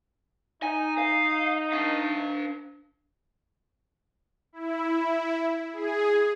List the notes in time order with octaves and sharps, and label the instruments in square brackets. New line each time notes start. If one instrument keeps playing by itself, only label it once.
[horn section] D#4 [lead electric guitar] G#5
[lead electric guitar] F5
D4 F5
[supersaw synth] E4
G#4